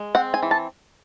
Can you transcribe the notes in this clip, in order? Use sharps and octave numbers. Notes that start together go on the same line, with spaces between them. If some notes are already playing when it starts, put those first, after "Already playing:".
Already playing: G#3
C4 F#5
G#5
E3
A5